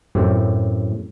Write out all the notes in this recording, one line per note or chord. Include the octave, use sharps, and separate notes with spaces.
F#2 A2 C4 G4